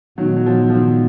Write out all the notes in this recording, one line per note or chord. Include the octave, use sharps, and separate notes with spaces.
A#2 D#3 F#3 G#3 B3
F#3
F3
F3
D#3